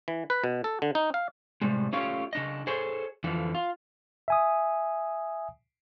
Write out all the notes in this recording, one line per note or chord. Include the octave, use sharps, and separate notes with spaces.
E3
B4
B2
A4
D3
D#4
F5
A2 C3 G3 G#3
A3 C#4 F4 G4 C#5 F5
C#3 D4 D#5
G#4 A4 C5 C#5
F2 D3 E3 F3
F4
E5 G#5 D#6